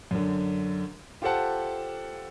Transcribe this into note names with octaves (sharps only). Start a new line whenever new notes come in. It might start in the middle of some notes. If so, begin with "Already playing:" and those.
F#2 D3
F4 G4 A4 C5 F#5 A5